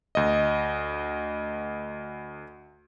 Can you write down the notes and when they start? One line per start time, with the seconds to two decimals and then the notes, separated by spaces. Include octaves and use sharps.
0.15 D2 D#5